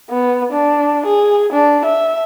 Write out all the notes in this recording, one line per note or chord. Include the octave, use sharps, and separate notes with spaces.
B3
D4
G#4
D4
E5